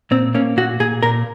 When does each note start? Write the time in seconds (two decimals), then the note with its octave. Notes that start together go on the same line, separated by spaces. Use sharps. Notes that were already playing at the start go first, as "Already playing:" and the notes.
0.11 A#2 C4
0.34 A#3 C#4
0.57 A#2 F#4
0.80 A#2 G#4
1.03 A#2 A#4